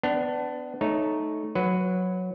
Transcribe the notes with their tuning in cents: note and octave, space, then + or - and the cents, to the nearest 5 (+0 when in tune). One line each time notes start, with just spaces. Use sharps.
B3 +30 D4 +0
A3 -15 D#4 +0 C#5 +0
F#3 -10 B4 +15